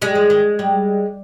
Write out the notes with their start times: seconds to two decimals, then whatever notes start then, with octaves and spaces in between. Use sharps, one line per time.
0.02 G3 G#3
0.15 F3
0.30 D#3
0.59 G3